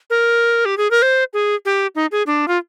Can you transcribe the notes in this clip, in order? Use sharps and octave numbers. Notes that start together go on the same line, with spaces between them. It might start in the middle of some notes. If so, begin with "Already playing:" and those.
A#4
G4
G#4
A#4
C5
G#4
G4
D#4
G#4
D4
F4